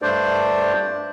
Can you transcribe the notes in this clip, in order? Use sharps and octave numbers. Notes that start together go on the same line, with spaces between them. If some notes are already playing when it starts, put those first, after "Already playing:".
G2 A3 D4 C5 D5